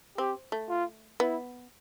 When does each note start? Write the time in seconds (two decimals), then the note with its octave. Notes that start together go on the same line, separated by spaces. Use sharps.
0.18 C4 G4
0.52 A3
0.69 F4
1.20 B3 E4